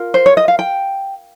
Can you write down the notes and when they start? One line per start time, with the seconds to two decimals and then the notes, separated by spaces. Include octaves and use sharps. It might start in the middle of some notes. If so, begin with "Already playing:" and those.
Already playing: F4 A#4
0.14 C5
0.26 C#5
0.37 D#5
0.48 F5
0.59 G5